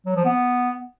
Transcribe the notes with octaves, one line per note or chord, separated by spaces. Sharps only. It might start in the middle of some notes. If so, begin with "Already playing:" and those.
F#3
F3
B3